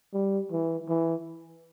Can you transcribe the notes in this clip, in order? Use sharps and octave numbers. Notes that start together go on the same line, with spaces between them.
G3
E3
E3